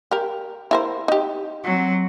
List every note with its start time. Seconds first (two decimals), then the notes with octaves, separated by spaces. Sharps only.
0.11 G4 A#4
0.71 E4 A#4 C5
1.08 D#4 G4
1.64 F#3 C4